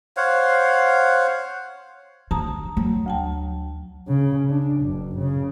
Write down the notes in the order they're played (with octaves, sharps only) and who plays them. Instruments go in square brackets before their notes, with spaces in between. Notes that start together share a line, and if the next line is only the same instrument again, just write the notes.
[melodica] C5 C#5 F5 F#5
[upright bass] D3 [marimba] A5 A#5 D#6
[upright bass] F#3
[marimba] D2 G5 A5
[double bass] C#3
D4
F#1
C#3